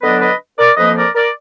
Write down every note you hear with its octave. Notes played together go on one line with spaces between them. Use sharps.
D3 F#3 B3 D4 B4 D#5
B4 D#5
A#4 D5
F2 F3 A#3 B4 D#5
A#4 D5
A#4 D5